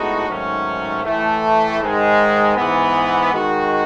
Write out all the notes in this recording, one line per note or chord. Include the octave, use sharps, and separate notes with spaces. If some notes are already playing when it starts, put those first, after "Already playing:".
Already playing: A2 G#3 B3 D#4 F#4
G#2 D#3 F#3 A3 C#4
A2 E3 A3
G#2 D#3 G#3
G#2 E3 B3
D#3 G#3 D#4 F#4